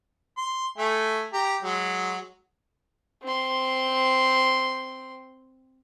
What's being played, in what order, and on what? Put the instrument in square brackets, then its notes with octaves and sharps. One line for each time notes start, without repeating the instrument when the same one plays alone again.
[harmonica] C6
A3 E5 G#5
G4 A#5
F#3 G#3
[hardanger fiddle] C4 C6